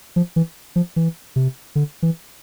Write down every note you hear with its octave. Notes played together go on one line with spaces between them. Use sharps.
F3
E3
F3
E3
C3
D3
E3